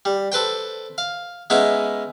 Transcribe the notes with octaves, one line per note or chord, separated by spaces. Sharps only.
G3
A4 B4 C5 G5
F5
G#3 B3 C#4 D#4 E4